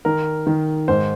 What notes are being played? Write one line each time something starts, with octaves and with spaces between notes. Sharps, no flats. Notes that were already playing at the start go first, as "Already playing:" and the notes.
D#3 A#4
D#3
G#2 C5